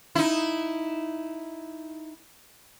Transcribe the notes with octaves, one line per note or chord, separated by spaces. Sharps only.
D#4 E4